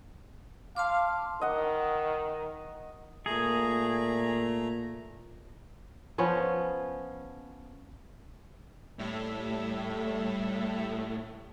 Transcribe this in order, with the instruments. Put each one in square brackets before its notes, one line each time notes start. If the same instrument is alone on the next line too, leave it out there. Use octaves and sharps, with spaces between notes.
[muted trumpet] F5 [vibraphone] A5 C6 D6
[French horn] D#3 [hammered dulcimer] D#5 F#5
[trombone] A#2 [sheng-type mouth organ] A3 A#5 [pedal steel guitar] G#4
[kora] F3 B3 C#4
[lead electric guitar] A2 [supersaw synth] G3 A4 E5